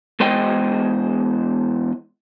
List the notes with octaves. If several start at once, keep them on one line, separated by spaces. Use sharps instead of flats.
E2 G#3 C5 D#5 G5